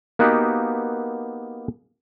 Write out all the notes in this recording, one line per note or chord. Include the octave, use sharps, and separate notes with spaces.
A#3 B3 D#4 F#4 G4 B4